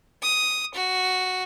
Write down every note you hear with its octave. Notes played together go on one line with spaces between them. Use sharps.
D#6
F#4